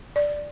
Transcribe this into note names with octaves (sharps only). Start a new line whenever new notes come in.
D5